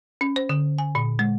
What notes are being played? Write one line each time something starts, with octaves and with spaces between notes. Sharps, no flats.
C#4
C5
D3
G#5
A#2
G#3